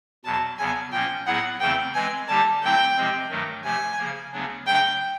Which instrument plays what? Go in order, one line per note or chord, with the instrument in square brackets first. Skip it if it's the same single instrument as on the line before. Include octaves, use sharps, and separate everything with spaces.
[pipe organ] E2 B2 F#3 [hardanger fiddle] A5
[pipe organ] E2 C#3 F#3 B3 [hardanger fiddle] G#5
[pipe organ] A#2 F3 A#3 C#4 [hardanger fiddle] G5
[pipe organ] A2 F#3 B3 E4 G#4 [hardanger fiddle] F#5
[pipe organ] E2 C#3 E3 A3 C4 [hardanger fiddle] G5
[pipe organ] E3 G#3 C4 [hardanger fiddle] G#5
[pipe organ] D3 G3 A#3 D#4 G4 [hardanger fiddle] A5
[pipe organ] D3 F#3 A3 C4 E4 [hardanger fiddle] G5
[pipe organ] C3 F3 G#3 C4
G2 D#3 F#3 A3
[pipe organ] C3 F3 A3 [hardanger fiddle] G#5
[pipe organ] C#3 F3 A#3
D2 C#3 F#3 B3 D4
[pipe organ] C#3 F#3 A3 D4 [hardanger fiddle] G5